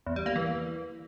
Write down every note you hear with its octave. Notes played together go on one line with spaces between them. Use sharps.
E2
G3
A#3
E3